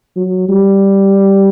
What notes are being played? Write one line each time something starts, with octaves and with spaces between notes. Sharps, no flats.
F#3
G3